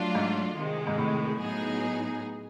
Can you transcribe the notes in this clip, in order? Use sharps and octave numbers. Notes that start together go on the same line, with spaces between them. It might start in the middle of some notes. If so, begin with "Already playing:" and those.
Already playing: F#3 A3 D4 F4
G#2
C3 D#3 G#3
G#2
A2
A2 F#3 B3 D#4 G#4